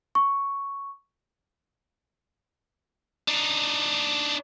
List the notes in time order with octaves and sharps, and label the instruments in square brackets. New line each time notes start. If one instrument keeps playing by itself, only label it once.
[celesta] C#6
[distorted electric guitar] D4 D#4